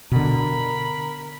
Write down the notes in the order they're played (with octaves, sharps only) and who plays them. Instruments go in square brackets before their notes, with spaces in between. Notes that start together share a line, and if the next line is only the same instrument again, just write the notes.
[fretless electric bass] B2 D3 [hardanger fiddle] A#4 B5